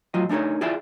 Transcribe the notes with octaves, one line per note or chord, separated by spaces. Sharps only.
A2 F#3 F4 D#5
A3 D4 D#4 A#4 C#5
E4 F4 G#4 D5 E5 G5